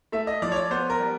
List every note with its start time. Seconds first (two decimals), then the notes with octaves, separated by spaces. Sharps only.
0.12 A3 E5
0.27 D#5
0.42 F3 D5
0.52 C#5
0.56 D5
0.70 B3 C5
0.90 A#4
1.00 G3